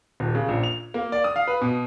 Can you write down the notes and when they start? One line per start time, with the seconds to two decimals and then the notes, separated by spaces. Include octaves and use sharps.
0.20 D#1
0.35 C#3
0.48 A#1
0.63 F7
0.94 A#3
1.12 D5
1.24 D#6
1.36 F5
1.48 B4
1.61 B2